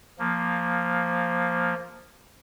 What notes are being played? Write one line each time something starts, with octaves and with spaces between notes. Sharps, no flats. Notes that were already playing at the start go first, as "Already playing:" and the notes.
F3 A#3